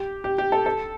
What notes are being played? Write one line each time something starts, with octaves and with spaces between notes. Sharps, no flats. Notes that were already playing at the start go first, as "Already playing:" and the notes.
Already playing: G4
G4
G4
A4
A4